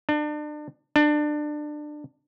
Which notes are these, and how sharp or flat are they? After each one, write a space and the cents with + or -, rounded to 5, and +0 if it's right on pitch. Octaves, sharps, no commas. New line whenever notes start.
D4 +35
D4 +25